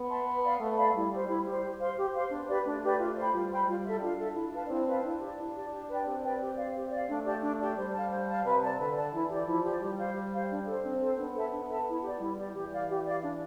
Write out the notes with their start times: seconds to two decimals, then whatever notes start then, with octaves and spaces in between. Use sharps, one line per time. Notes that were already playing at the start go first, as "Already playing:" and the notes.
Already playing: B3
0.09 E5 A5 C6
0.26 B4
0.43 D5 F5 B5
0.60 A3 B4
0.77 D5 F5 B5
0.94 G3 E4
1.12 G4 C5
1.29 G3 E4
1.46 G4 C5
1.63 G4
1.79 C5 F5 C6
1.97 G4
2.13 C5 F5 C6
2.31 B3 D4
2.48 G4 B4 D5
2.65 A3 D4
2.83 G4 B4 D5
2.99 F4
3.16 C5 G5 B5
3.33 G3 F4
3.50 C5 G5 B5
3.67 G3 F4
3.85 A4 E5
4.02 D4 F4
4.19 A4 E5
4.35 E4
4.53 B4 F5 A5
4.70 C4 E4
4.87 B4 F5 A5
5.04 D4 E4
5.21 G4 D5
5.37 E4
5.56 G4 D5
5.72 G4
5.89 B4 D5 G5
6.06 C4 G4
6.23 B4 D5 G5
6.41 G4
6.57 D5 F5
6.74 G4
6.91 D5 F5
7.09 A3 D4
7.25 G4 D5 A5
7.42 D4
7.60 G4 D5 A5
7.77 G3 C5
7.94 F5 A5
8.10 C5
8.28 F5 A5
8.45 C3 B4
8.62 D5 A5
8.79 D3 B4
8.96 D5 A5
9.13 E3 E4
9.30 G4 D5
9.47 F3 E4
9.64 G4 D5
9.81 G3 G4
9.99 C5 F5
10.15 G4
10.33 C5 F5
10.50 D4
10.67 A4 C5
10.84 C4 D4
11.01 A4 C5
11.18 B3 D4
11.36 A4 E5 A5
11.52 D4
11.69 A4 E5 A5
11.87 E4
12.03 G4 D5
12.20 G3 E4
12.38 G4 D5
12.55 E3 G4
12.72 D5 F5
12.89 G4
13.05 D5 F5
13.23 D4